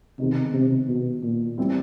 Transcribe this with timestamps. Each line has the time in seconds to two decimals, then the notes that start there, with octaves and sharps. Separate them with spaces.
0.19 C3 D#3 G#3 B3 D#4
0.54 C3
0.88 B2
1.23 A#2
1.58 E3 G3 C4 E4